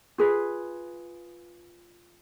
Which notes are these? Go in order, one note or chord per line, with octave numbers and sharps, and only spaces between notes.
F4 G#4 B4